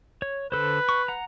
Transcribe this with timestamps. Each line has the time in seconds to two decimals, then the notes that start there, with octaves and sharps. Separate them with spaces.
0.22 C#5
0.52 D3 A4 B4 C5
0.89 C#6
1.08 F#5 A#5